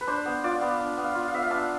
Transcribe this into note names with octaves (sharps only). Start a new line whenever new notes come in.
B4
D4 C5
B3
F4 D5
B3
D4
B3
F5
F4
F5
B3 E5
F5
D4 A5